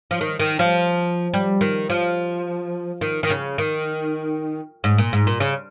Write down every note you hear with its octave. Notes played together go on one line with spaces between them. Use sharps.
F3
D#3
D#3
F3
G3
D#3
F3
D#3
D#3
C#3
D#3
G#2
A#2
G#2
A#2
C#3